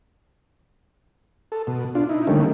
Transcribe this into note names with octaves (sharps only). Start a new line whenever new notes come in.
A4
B2
D4 F4
D#4 E4
D3 D#3 G3 A3 A#3 C#4